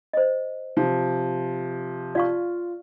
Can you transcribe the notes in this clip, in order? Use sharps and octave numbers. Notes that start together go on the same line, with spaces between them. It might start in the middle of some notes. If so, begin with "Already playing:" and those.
C5 D#5
C3 F3
F4 D5 F5 C#6